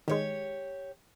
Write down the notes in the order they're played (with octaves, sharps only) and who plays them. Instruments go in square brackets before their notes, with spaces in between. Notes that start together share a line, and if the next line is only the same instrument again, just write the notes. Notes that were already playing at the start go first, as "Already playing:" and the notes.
[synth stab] D#3 G#3 [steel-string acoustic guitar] G4 C#5